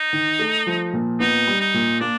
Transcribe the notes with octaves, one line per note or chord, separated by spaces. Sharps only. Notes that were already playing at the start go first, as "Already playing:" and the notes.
Already playing: D#4
D#3
A3
F3
A#2
B3 D#4
G3
D#4
A#2
A#3 D4